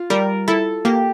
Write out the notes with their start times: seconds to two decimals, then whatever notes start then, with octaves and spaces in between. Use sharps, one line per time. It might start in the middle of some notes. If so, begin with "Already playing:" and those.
Already playing: F4
0.10 G3 A#4
0.48 E4 A4
0.85 A#3 G4